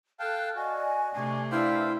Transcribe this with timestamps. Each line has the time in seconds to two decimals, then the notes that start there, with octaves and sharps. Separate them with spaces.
0.20 A4 F5 G5 A5 F#6
0.56 F#4 D5 D#5 G#5
1.15 C3 A3 D4 G#5 C#6
1.51 D4 E4 B4 C5 F5 G5